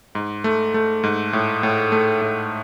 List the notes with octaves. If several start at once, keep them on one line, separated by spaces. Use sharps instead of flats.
G#2
A3
A3
G#2
A2
A2
A3
A2